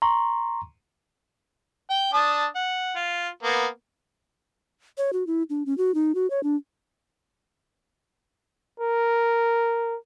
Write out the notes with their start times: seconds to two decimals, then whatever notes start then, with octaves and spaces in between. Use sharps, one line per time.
0.02 A#5 C6 C#6
1.90 G5
2.13 D4 A5 D#6
2.55 F#5
2.96 F4
3.43 A#3 B3
4.98 C#5
5.13 F#4
5.27 E4
5.50 D4
5.66 C#4
5.78 F#4
5.94 D#4
6.15 F#4
6.30 C#5
6.43 D4
8.80 A#4